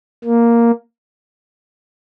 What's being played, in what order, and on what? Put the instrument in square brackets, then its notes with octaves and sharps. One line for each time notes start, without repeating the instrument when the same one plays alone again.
[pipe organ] A#3